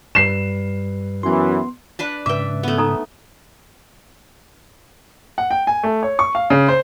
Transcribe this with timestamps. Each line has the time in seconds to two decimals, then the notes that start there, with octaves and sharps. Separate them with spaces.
0.15 G2 G3 B4 C7 E7
1.23 F#2 E3 B3 C6
1.99 D4 B4 A5
2.26 G#2 C#3 B4 E5 G5 D6
2.63 A3 B3
2.78 D#4 A4 A#5
5.38 F#5
5.51 G5
5.67 G#5
5.83 A3
6.03 C#5
6.19 C#6
6.35 F5
6.50 C#3
6.68 C5